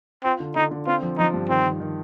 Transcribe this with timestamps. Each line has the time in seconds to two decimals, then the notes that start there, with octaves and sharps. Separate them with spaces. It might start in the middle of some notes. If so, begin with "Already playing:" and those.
0.24 C4 F4
0.40 D3
0.56 D3 D#4
0.71 D3
0.87 C4 F4
1.02 F3
1.18 F3 D#4
1.34 G2
1.49 D#3 C4
1.65 D#3
1.80 D#3